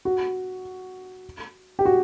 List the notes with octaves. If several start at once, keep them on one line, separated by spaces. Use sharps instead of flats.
F#4
G4
F#4